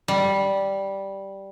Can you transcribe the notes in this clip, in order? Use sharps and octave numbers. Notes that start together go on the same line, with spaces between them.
G3